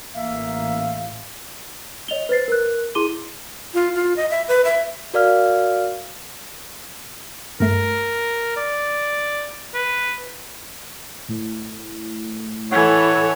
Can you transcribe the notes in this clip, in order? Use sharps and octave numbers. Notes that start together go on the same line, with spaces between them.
A1 A#3 E5 F5
C#5 D#5 F7 G7
B4 C5 A6 C7
A#4 F#6
E4 G#4 C6 D6 D#7 G7
F4
F4
D#5
E5
B4
E5
F#4 A#4 D5 F5 F6
G2 A3 A#4 B6
D5
B4
A2
E3 A4 C#5 F#5 G#5